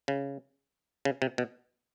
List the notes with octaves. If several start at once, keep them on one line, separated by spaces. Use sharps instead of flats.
C#3
C#3
C3
B2